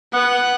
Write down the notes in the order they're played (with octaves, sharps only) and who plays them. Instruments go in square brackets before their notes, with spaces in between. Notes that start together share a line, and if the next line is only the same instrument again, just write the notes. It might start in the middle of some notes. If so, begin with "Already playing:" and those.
[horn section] B3 [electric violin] F#5